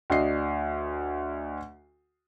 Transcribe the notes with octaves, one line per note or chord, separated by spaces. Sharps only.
D2 D4 D#5 C7